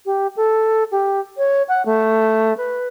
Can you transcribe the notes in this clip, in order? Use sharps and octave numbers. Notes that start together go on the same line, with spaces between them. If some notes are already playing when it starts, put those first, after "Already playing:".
G4
A4
G4
C#5
F#5
A3
B4